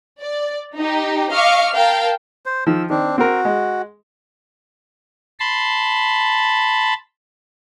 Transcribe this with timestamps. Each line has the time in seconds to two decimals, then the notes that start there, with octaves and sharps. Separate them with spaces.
0.20 D5
0.78 D#4 G4
1.32 D#5 F5 C#6 D6 F6
1.75 A#4 F5 G5 A5
2.46 C5
2.67 D#3 F3 E6
2.90 D#3 C4 D4
3.18 C4 F#4 A#4
3.45 G#3
5.40 A5 B5 C6